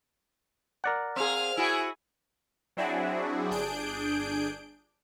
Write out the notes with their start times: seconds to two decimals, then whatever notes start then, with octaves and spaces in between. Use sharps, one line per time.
0.84 A#4 D5 F#5
1.16 C4 G#4 F5 F6
1.57 E4 F#4 G#4 G#5
2.77 F#3 C4 D4 E4 F#4 G#4
3.50 G1 D4 G#4 G6 D7